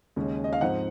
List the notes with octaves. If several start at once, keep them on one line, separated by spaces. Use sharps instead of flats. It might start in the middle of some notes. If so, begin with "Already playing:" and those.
D#2 C#3 G#3 C#4
D#5
F5
G#2 F3 C4 D#4 F#5